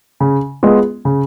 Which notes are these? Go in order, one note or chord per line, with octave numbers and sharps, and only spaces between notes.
C#3
G#3 B3 F4 G#4
C#3